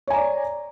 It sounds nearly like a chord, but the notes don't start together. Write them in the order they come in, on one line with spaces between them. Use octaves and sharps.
C#5 G#5 A#5 D5